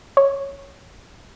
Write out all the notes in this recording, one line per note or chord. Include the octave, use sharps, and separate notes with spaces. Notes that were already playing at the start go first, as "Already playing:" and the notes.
C#5